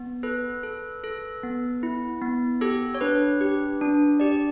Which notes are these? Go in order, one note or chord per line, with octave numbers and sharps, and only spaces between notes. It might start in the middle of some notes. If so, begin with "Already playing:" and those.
Already playing: B3
A4 B4
A4
A4
B3
E4
B3
G4 A4
C#5
D4 B4
G4
D4
G4 D5